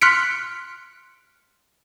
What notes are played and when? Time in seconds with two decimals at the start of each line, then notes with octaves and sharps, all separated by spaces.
0.01 C6 F6 F#6 B6 C#7 D7